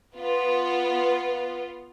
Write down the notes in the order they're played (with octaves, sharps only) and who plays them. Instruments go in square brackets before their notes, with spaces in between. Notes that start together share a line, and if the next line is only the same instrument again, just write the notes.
[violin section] B3 F4